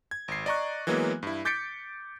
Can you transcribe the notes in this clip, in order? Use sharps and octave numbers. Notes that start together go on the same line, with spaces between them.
G#6
G#1 C7
D5 D#5 A#5 C#6 F#6
E3 F#3 G#3 A#3 B3
G2 E4
D6 G6 A6 B6 C#7 D7